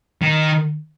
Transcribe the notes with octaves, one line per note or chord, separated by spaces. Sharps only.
D#3